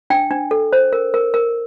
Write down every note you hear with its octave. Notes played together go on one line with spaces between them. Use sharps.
D4 G5
D4
A4
C5
A#4
A#4
A#4